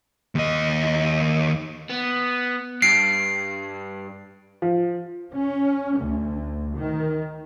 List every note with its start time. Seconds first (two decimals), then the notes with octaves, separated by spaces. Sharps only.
0.35 D#2 D#5
1.90 B3
2.82 G2 C7 D7
4.62 F3
5.34 C#4
5.97 D2
6.76 D#3